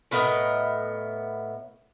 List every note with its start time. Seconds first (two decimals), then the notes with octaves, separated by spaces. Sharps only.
0.11 A2 B3 A#4 D#5